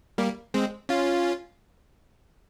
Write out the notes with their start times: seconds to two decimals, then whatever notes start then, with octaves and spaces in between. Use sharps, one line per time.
0.18 G3 A#3
0.54 G#3 C4
0.89 C#4 F4